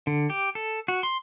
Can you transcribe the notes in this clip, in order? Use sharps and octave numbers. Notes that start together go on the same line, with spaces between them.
D3
G4
A4
F#4
C6